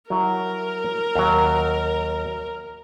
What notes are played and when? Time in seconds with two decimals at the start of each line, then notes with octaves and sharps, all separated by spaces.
0.10 F#3 E4 A#4
1.15 D#2 F#3